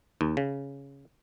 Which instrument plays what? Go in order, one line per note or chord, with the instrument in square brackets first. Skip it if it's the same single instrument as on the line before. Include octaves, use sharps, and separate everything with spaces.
[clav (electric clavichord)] D#2
C#3